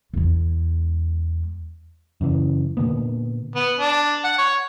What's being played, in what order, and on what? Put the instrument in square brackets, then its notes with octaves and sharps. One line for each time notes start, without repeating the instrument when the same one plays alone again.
[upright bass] E2 G#3
[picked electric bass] F#2 C#3 E3
A#2 D3 A#3 B3
[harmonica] B3
D4
F#5
C#5